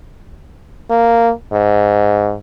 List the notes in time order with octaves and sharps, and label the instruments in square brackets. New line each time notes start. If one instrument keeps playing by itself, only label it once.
[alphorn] A#3
G#2